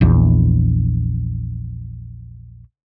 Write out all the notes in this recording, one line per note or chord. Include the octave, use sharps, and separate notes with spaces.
A#1 E2